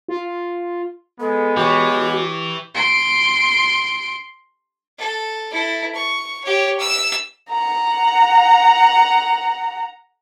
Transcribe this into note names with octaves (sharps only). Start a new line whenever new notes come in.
F4
G#3 B3 A4
E3 F#4 G4 C#5
C6 D7
A4
E4 A4
C#6
G4 C#5
E6
F#5 A#5